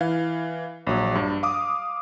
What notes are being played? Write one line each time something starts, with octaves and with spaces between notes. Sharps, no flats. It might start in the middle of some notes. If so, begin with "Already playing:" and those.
E3 F5
A#1 F#3
G2
F5 D6 D#6